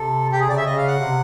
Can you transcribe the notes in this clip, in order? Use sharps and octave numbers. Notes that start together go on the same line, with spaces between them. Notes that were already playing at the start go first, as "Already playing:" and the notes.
Already playing: C3 A4
C3 G4
G#4
C#3 D5
E5
C#3 D#5
F5
F#5
C3